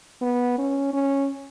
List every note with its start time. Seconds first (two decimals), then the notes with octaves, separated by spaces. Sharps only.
0.22 B3
0.58 C#4
0.93 C#4